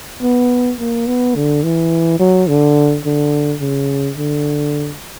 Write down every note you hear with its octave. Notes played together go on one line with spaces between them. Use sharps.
B3
A#3
B3
D3
E3
F#3
D3
D3
C#3
D3